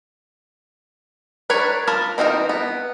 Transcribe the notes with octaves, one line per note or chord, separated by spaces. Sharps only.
D4 A#4 B4 C#5
F4 A#4 A5 B5
E3 C4 D#4 F4 A#4
B3